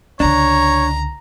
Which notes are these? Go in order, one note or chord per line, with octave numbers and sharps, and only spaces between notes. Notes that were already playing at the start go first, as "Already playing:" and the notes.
C#2 D3 D4 C#5 A#5